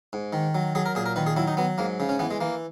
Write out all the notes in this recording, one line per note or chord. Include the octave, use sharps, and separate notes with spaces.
G#2
D#3
F#3
F#3 G#4
A#4
A#2 G#4
A#4
D#3 B4
G#4
F#3 E4
D#4
F#3 B3
G#2 A#3
C#3
C#4
E3 B3
G#3
E3 A#3